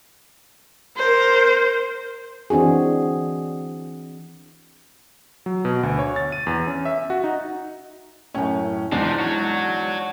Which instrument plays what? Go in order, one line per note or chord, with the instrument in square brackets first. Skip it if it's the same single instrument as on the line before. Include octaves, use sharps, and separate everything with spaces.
[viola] A#4 C5
[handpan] E3 C4 D4 F#4 G#4
[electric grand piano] F#3
B2
D2
C#5
A6
D#7
E2
C#4
E5
F#4
D#4
[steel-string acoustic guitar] F#2 A2 [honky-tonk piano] C#4
[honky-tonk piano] E2 G#2 [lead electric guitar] F3 [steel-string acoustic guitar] D4
[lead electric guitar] F#4 C#5